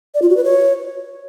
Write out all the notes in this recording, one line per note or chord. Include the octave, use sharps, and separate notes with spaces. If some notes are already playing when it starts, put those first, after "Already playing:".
D5
F4
F#4
B4
C#5